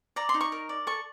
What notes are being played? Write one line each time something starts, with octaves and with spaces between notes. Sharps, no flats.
D5 A#5
C6
D#4
C#6
A#4
D5
A4 C#6